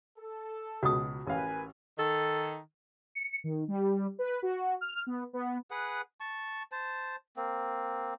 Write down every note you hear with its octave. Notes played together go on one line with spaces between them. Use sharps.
A4
C#2 B2 F#4 D#6
A1 A#4 B4 F5 G#5
D#3 A4
C#7
D#3
G3
B4
F#4
F6
B3
B3
G#4 B4 F#5
A5 C#6
C5 A5
A#3 C4